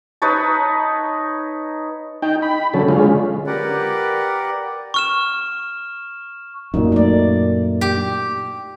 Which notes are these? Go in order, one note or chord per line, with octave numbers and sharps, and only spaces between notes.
D#4 B4 C#5 A5
D#4 G5
B5
D3 F#3 C#4 A4
D3 G#3 C#4 F4
G4 A#4 B4 D5 F#5
C#6 F6 E7
F#2 A#2 D#4
A3 D5
G4